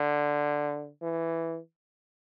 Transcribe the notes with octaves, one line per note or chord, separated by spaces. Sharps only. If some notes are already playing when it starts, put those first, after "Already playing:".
Already playing: D3
E3